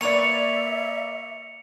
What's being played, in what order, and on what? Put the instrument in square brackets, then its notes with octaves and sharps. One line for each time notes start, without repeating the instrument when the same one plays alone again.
[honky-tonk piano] A#3 D5 [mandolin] B4 C#5 C#6 [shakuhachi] E5 [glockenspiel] C#7 F7